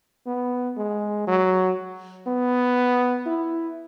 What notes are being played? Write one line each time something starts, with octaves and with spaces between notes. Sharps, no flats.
B3
G#3
F#3
B3
E4